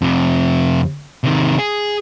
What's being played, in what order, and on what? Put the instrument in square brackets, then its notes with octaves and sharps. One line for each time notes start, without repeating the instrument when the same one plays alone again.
[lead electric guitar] F2 C3
C3 D#3
G#4